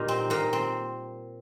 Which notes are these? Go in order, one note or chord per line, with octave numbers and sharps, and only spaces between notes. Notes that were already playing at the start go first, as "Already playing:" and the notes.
Already playing: A#2 G3 A#3 D#4
C4
A#2 A#3
C4